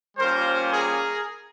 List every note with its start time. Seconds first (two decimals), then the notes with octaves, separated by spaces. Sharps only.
0.18 G3 A#3 C#4 F4 A#4 C5
0.72 G#4 A#4